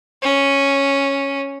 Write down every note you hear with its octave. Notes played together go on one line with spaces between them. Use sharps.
C#4